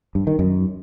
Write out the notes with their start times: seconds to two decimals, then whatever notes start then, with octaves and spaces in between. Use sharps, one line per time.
0.15 G2
0.27 D#3
0.39 F#2